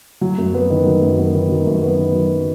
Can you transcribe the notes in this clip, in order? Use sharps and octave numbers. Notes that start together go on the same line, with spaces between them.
F#3
F#2
B3
D#3
F#3
F#2
B3
D#3
F#3
F#2
B3
D#3
F#3